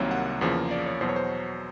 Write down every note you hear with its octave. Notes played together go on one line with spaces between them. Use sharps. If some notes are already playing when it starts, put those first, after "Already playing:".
Already playing: C2 C3 D#3 F#3 A#3 C#5
F#5
E2 C#3 F3 A#3
D5
C#5
E2 B2 F#3 C5
C#5
C5